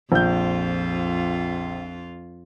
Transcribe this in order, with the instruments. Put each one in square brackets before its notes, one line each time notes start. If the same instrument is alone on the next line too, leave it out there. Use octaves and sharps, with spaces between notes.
[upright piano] A#1 G6 [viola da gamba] F2 F4